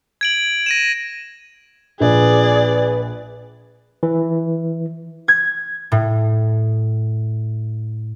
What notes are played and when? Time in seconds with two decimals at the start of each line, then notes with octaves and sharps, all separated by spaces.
0.21 G#6 D7 F#7
0.66 A#6 D#7 E7
2.00 A#1 G#4 B4 D5
4.03 E3
5.28 G#6
5.92 A2